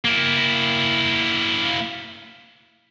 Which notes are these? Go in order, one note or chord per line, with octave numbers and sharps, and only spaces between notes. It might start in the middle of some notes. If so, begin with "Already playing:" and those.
A#3 E4